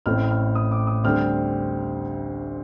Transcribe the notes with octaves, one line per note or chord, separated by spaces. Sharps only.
A1 A2 A3 C4 F6
F6
D#6
D6
D#6
D2 D3 G3 C4 F6